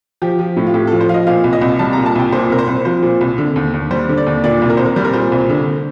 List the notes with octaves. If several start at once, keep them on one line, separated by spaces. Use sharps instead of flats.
F3 G4
F3
A2
F4
A2 G4
F3 A4
C5
F3 D#5 F5
A#2 F5
C2
D#5
C2
G3 A5
A#2 A#5
A5
C2 G5
A#2 C5
C2 A#4
C5
C2
F3 C5
A#2
C2
D3
D#2
D#2
G3 C5
D3
D5
D#2
A#2 D5
C2
A#4
C2 C5
A#4
G3 C5
A#4
A#2 C5
C2
D3